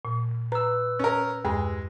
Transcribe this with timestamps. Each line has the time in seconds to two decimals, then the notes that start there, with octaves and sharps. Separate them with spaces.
0.05 A#2
0.52 B4 A#5 E6
0.99 C#4 A#4
1.45 E2 G2 G#3